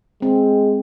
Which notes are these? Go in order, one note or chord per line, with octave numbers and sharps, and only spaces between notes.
G#3 C4